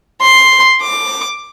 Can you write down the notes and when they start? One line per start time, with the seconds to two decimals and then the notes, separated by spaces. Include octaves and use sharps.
0.21 C6
0.82 D6